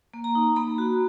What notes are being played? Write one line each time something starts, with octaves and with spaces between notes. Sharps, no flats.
A#3
A#5
D#4
A#3 B5
F#4